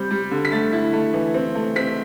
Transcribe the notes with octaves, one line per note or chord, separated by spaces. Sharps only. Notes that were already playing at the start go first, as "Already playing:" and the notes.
Already playing: G3 C4 G6
G3
D3
B6
A3 A6
E4
A3
E3
C4
A3
C4 B6